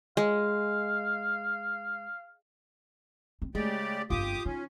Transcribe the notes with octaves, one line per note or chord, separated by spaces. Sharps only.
G#3 F5
C4
C#3 G#3 A3 G4 D5
G1 F2 F4 G4 D6 D#6
D#3 C#4